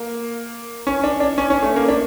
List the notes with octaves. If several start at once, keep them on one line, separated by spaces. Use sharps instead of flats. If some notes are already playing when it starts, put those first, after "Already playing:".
Already playing: A#3
C#4
D4
D4
C#4
C#4
A3
A#3
D4